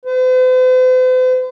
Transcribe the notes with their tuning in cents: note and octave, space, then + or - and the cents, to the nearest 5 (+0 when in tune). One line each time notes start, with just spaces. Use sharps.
C5 -45